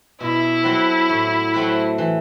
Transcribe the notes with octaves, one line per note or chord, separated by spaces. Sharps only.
B2 E4
F#3 C4 F#4 A4
A2
F#3 A3 C4 F#4
E3